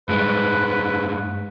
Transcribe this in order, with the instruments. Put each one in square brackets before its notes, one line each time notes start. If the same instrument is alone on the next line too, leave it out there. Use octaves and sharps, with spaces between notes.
[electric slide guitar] G2 G#3 [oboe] B4